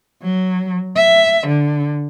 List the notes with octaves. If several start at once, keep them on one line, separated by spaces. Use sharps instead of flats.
F#3
E5
D3